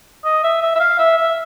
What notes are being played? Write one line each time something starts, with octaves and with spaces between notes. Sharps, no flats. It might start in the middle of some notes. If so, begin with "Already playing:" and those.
D#5
E5
E5
E5
F5
E5
E5